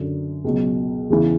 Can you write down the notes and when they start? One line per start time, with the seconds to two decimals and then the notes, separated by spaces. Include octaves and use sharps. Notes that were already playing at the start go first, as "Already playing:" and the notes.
Already playing: F#2 D3 F#3
0.44 C#2 B2 F#3
1.10 E2 C#3 E3